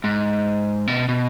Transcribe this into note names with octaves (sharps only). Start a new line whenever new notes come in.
G#2
B2
B2